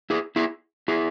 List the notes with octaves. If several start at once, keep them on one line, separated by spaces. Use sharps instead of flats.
E4 G#4
E4 G#4
E4 G#4